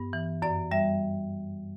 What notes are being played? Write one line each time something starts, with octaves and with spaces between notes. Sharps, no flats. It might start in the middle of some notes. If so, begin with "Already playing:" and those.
Already playing: G2 B3
E3
F#2 D5
G3 E5